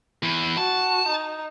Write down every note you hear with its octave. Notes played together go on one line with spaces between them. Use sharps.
E2 E3
F#4 A5
D#4